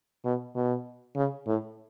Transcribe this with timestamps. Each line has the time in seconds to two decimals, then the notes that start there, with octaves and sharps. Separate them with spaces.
0.25 B2
0.55 B2
1.16 C#3
1.47 A2